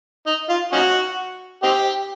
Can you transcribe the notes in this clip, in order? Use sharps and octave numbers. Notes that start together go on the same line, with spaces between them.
D#4
F4
C#4 D#4 F#4
C4 D#4 G4